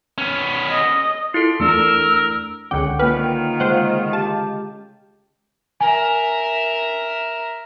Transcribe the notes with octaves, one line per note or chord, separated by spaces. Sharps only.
B3 C#4
D#5
E4 F4 A4 C6
E2 A3 D4 A#4 E6
C#2 D3 C#4 F#5 G5 D6
D#3 A#3 F4 B4 G5 F6
C#3 G#3 C5 F#5
G4 A5
A#4 E5 G#5